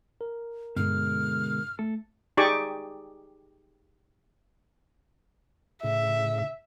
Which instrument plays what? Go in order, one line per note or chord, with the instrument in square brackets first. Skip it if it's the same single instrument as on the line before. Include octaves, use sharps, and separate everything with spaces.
[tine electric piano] A#4
[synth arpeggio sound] G2 [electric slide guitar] B2 D3 G#3 [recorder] F6
[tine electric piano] A3 [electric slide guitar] A4
[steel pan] D#4 G4 G#4 D5 C#6 D6
[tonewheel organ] A2 C#3 [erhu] E5